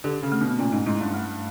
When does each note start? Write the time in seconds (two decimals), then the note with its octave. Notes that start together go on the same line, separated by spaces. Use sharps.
0.04 D3 G4
0.23 C#3
0.32 A3
0.41 B2
0.59 A#2 C#4
0.72 G#2
0.86 G#2 E4
1.01 G2
1.14 A3